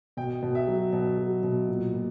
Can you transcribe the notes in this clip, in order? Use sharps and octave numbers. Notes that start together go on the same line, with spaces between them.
B2 G5
B2
E5
F#3
B2
F#3
B2
A#2
A#2